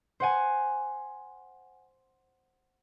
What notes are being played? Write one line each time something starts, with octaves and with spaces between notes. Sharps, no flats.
C5 F#5 G#5